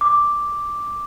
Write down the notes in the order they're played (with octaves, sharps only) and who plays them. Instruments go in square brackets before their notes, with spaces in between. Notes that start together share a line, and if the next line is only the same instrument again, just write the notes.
[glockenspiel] D6